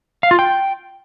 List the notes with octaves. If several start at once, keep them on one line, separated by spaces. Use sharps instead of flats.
F5
F4
G5